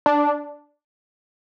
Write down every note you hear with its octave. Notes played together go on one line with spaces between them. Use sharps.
D4